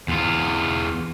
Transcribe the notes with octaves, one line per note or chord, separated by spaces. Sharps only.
E2 F4